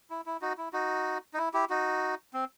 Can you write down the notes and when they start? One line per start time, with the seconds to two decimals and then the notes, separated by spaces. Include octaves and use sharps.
0.10 E4
0.26 E4
0.42 D#4 F#4
0.58 E4
0.73 D#4 F#4
1.34 D#4
1.38 E4
1.54 E4 G4
1.69 D#4 F#4
2.33 C4